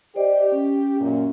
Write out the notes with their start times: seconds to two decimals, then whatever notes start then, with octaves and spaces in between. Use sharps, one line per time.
0.16 G4 C5 D5 D#5
0.52 C#4
1.00 F#2 A#2